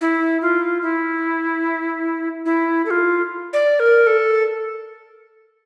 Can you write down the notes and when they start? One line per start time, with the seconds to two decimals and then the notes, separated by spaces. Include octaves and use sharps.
0.01 E4
0.42 F4
0.82 E4
2.46 E4
2.86 A4
2.90 F4
3.53 D5
3.80 A#4
4.07 A4